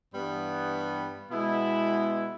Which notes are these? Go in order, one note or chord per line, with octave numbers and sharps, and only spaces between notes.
G2 E3 G3 B3
B2 G#3 B3 E4